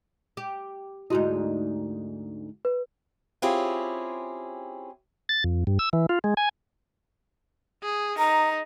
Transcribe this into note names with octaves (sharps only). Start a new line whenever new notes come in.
G4
D2 G#2 D#4 E4 F#4
B4
C4 C#4 E4 F4 G4 G#4
A6
F2
G2
E6
E3
F4
G#3
G#5
G#4
D#4 A#5